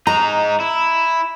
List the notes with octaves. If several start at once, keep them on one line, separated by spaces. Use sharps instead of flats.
G#3 D#4 A#5
E4